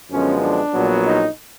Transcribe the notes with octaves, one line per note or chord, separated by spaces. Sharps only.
F#2 D3 F3 G#3 B3 C#4
D4
A#1 A#2 F#3 B3
D#4